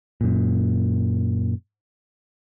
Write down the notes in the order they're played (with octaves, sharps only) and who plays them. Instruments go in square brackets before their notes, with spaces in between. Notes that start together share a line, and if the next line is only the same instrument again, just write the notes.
[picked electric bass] F#2 A#2